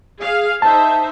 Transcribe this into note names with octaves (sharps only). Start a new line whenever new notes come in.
G#4 F5
D#4 C5 E5 A5